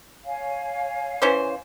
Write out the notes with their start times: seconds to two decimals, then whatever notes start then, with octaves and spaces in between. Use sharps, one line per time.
0.25 C#5 F5 G#5
1.22 E3 C#4 C5